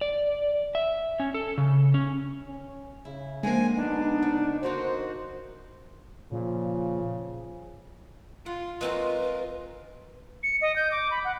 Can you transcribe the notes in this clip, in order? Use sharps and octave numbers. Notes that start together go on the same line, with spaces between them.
D5
E5
C#4
A4
C#3
C#4
C#4
C#3 E4
D3 F3 G#3 A#3 C4 G#5
B3 D4 D#4
C#3
D3 A#3 D#4 F#4 C5
A#2 C#3 F3
F4 F#5
G#3 C4 F4 F#4 A#4 B4
C#7
D#5
G6
D6
B5
F#5